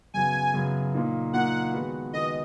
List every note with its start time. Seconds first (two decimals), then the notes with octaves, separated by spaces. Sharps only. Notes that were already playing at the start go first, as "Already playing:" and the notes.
0.14 F#2 C#3 F#3 B3 F#4 G#5
0.54 F#2 C#3 F#3 B3 F#4
0.94 A#2 A#3 D#4
1.33 A#2 A#3 D#4 F#5
1.74 D#3 G#3 B3 F#4 B4
2.13 D#3 G#3 B3 F#4 B4 D#5